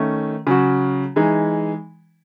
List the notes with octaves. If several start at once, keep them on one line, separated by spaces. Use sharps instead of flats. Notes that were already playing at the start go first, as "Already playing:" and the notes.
Already playing: D#3 A3 C#4
C#3 F#3 C#4 F#4
E3 G#3 D#4